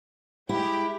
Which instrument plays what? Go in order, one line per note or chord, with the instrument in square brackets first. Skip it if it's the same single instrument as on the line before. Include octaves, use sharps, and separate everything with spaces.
[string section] G#3 G4 [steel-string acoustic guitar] E4